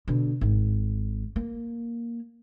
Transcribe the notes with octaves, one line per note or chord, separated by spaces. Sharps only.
B2 D3
G#1
A#3